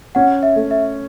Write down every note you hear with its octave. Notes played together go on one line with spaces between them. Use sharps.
C#4 F#5
E5
A3
E5